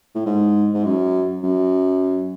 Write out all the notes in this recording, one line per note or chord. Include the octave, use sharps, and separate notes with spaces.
A2
G#2
G#2
F#2
F#2